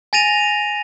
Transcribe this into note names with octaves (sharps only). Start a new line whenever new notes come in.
G#5 A6 A#6 D#7 F7